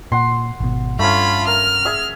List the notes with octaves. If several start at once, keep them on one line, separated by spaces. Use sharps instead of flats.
A#2 F#5 C6
G#1 B2
G2 A3 C#4 F4 B5
A#4 F6
G#4 E5 E6